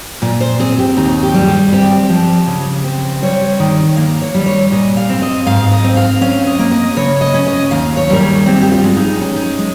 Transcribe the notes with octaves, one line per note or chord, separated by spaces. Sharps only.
A#2 F4
C5
C4 G#4
G4
D#2 D#4
G4
G3
G#4
C4 G4
F3
C#3
C4
G3 C#5
D#3
A#3 F5
C#5
G3
C#5
A#2 D#5
F5
C4
D#5
G#2 F5
D#5
C4
F5
C#4 F5
D#5
A#3
D#5
C#3 C#5
D#5
C#4
D#5
D#2 F5
C#5
G3 A#4
G#4
C4 G4
G4
F4
G#3
D#4
C#4 D#4
D#4
G#3